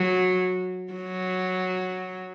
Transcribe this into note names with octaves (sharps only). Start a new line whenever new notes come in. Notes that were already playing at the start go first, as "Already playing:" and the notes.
Already playing: F#3
F#3